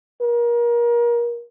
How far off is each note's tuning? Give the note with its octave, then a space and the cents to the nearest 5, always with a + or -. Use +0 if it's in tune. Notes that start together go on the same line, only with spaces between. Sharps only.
A#4 +30